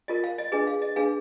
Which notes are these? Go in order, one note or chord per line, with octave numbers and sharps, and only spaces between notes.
F4 A#4 D#5
F5
D#5
D4 G#4 B4 D#5
F5
D#5
D4 G#4 B4 F5